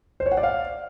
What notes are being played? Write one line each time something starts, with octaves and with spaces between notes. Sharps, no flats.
C5
C#5
F#5
D5
F5